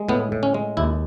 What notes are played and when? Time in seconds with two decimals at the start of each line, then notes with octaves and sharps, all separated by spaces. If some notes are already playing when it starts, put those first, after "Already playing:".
Already playing: G#3
0.09 A2 B3
0.32 A2
0.43 C#4
0.54 G#3
0.77 D#2 E4